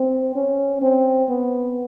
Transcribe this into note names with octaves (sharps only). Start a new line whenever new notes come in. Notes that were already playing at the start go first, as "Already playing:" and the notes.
Already playing: C4
C#4
C4
B3